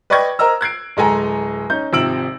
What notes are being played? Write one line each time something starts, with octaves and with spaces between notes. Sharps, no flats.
B4 D5 D#5 G5 C#6 G#6
A#4 C5 D#5 A#5 E6
F#6 G#6 C7 D7
D1 G#3 A4 G#5 A#5
C#4 D#4 G6
G#1 C3 F3 E6 D7 F#7